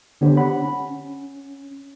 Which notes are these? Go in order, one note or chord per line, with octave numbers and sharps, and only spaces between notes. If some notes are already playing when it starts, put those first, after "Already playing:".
D3 B3 D4 G4 C5 C#5
F#5 B5
C#4